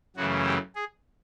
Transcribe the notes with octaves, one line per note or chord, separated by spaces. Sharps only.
F#2 C#3 E3 A3 F#4
G4
G#4